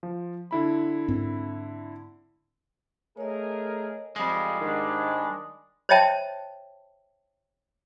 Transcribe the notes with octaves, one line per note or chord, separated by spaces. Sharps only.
F3
D3 E4 B5
G#2 C4
A3 G#4 A#4 C#5 D#5
F2 G3 G#3 D#6
G#2 D#3 D4
C5 C#5 D#5 E5 G5 A5